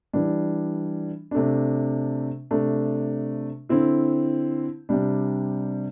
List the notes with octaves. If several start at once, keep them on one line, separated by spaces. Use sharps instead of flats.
E3 G3 D4
C3 A3 D4
C3 A3 D4
D3 C4 E4
C3 G3 D4